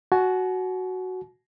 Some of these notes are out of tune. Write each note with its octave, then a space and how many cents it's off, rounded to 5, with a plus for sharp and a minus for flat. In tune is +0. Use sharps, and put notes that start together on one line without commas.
F#4 +0 G#5 +45